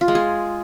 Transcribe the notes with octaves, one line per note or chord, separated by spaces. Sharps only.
F4
G#3
G#4